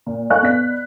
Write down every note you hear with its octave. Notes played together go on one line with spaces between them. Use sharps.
A#2
A4 D#5 F5 G#5 C#6 F#6
B3 D5 B6